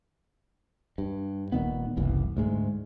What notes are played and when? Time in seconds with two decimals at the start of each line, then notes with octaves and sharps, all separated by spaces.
0.98 G2
1.52 D#1 A#2 D#3 B3
1.97 F#1 C2 E3
2.37 D2 G#2 G#3